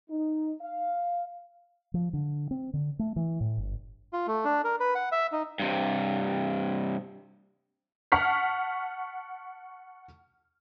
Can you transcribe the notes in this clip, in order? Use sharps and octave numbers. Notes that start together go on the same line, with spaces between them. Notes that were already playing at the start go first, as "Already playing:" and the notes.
D#4
F5
F3
D3
C4
D3
A3
E3
A2
G1
F4
A3
D4
A#4
B4
F#5
E5
D#4
G2 C3
F#5 A5 C#6 F6 B6 C7